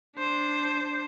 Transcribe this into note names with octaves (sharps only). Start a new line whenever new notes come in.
D4 C5